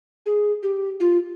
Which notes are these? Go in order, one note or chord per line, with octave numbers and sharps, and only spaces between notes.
G#4
G4
F4